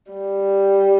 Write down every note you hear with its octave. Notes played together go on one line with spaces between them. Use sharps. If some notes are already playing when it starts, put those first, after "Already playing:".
G3